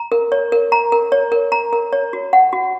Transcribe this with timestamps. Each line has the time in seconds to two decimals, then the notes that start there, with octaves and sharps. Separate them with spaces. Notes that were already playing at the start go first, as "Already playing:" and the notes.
Already playing: A#5
0.12 A#4
0.32 C#5
0.52 A#4
0.72 A#5
0.92 A#4
1.12 C#5
1.32 A#4
1.52 A#5
1.73 A#4
1.93 C#5
2.13 F#4
2.33 F#5
2.53 F#4